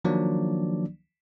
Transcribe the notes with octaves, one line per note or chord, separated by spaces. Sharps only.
D#3 F3 F#3 A#3 D4 D5